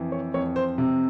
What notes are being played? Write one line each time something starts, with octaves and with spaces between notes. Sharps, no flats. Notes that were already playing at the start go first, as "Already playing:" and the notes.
Already playing: F2 E3
C#5
F2 C#5
C5
C3